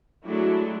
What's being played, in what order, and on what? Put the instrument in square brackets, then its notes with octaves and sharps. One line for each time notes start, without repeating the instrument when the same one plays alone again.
[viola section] F#3 G#3 A3 D4 E4 F#4